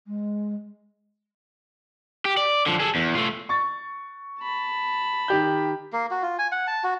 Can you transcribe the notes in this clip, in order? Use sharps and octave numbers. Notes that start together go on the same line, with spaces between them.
G#3
G4
D5
D3 F3
G#4 A4
E2
A3 F4
C#6 A6
A5 B5
D#3 G4 G6
A#3
F#4
F4
G#5
F#5
A5
F#4